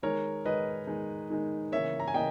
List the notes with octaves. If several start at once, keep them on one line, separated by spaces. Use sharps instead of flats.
D#3 G#3 D#4 A#4 C#5
D#3 G#3 D#4 B4 D#5
D#3 G#3 D#4
D#3 G#3 D#4
C#3 E3 A#3 C#5 E5
A#5
G#5
C#3 E3 A#3 D#5 G5